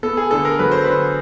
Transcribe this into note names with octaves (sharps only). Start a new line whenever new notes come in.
B3 A4
G#4
D3 A4
A#4
F#3 B4
C5
D3 B4